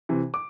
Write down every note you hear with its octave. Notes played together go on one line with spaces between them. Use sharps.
C3 E3
D6